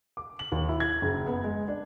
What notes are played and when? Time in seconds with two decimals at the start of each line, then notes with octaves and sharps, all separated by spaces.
0.17 D6
0.39 F#7
0.52 D#2
0.69 E4
0.80 G#6
1.02 F#1
1.27 B3
1.44 G#3
1.68 D4